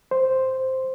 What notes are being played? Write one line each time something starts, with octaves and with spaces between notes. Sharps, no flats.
C5